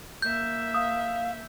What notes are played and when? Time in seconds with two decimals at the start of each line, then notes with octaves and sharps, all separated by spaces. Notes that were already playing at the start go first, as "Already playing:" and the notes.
0.22 A#3 E5 G6
0.74 F5 D#6